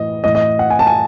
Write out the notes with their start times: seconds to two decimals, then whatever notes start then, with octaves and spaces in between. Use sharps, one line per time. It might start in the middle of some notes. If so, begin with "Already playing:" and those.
Already playing: A2 E3 D#5
0.24 A2 E3 D#5
0.35 D#5
0.59 F#5
0.70 G#5
0.79 A5
0.87 G#5